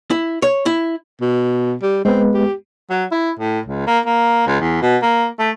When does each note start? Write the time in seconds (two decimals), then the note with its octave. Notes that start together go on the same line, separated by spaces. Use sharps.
0.11 E4
0.42 C#5
0.66 E4
1.21 B2
1.83 G3
2.05 G#3 B3 C4 B4
2.34 G4
2.90 F#3
3.12 E4
3.39 A2
3.66 C#2
3.87 A#3
4.06 A#3
4.47 C#2
4.60 E2
4.82 B2
5.02 A#3
5.39 A3